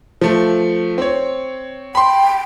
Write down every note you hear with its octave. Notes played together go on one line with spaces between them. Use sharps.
F3 A3
C4 C#5
G5 B5 C6